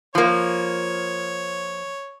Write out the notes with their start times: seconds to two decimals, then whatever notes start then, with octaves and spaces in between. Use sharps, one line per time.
0.15 F3 A#3 C#5